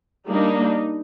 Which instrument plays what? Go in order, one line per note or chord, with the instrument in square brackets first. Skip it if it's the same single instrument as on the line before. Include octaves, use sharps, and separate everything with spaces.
[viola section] G3 A#3 D4 D#4